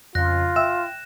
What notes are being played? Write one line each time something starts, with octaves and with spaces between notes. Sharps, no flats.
F2 C#3 F4 F#6 A#6
E5 G5 E6 E7